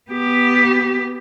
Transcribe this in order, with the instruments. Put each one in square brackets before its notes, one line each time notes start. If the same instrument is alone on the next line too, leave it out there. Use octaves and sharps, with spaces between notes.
[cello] B3 G4